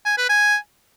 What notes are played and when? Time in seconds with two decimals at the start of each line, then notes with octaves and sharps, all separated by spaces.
0.06 G#5
0.18 B4
0.30 G#5